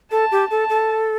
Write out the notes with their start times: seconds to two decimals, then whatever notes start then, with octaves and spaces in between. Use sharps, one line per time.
0.11 A4 A5
0.31 G4
0.50 A4 A5
0.70 A4